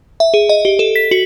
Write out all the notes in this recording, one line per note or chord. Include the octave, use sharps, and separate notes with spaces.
E5
G#4
D#5
G4
A4
B6
F#4